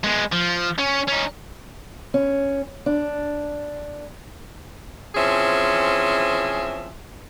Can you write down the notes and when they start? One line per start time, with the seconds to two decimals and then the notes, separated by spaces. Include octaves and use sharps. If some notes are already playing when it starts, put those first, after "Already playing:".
0.04 G#3 B3
0.32 F3
0.78 C#4
1.08 C#4 D#4
2.14 C#4
2.86 D4
5.15 E3 F3 C4 C#4 G#4 E5